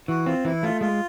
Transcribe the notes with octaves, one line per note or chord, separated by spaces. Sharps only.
E3 F#4
C4 F4
E3 E4
A3 F4
G#3 F4